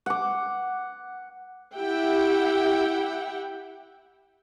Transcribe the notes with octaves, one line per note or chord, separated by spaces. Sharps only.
F#5 D6
E4 G4 E5 F#5 G5